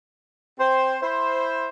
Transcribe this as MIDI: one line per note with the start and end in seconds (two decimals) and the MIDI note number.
0.59 0.96 60
0.59 0.96 72
1.02 1.67 64
1.02 1.67 72